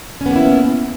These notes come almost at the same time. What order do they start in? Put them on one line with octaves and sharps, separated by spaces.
C#4 B3 A#3 E4